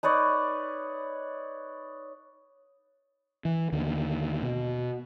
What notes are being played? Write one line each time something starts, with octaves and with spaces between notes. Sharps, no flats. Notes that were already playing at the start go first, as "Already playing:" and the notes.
D#4 B4 C#5 D5
E3
D#2 D3
B2